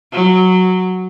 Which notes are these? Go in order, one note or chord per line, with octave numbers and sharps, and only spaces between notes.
F#3